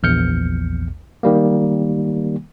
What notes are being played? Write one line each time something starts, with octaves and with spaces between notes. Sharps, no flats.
A#1 E2 F6 G6 C#7
D#3 G3 A#3